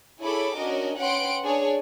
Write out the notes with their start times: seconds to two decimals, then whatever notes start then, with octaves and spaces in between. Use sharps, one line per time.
0.20 E4 G#4 A4 C#5 B5 D6
0.57 C#4 D4 F#4 A#4 D#5
0.97 C#4 B4 F#5 G5 C6 D7
1.44 D4 G#4 C#5